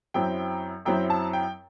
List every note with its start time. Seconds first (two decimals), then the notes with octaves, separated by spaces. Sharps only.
0.14 F#2 F#3 C4 E4 G5
0.85 F#2 F#3 C4 E4 G5
1.10 A5
1.33 G5